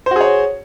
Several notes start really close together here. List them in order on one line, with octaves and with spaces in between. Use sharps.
C5 F#4 G#4 C#5